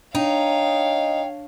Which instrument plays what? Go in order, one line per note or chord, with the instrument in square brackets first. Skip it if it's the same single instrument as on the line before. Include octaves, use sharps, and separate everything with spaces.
[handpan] D4 [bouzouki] D#4 [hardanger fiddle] C#5 F5 [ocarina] G5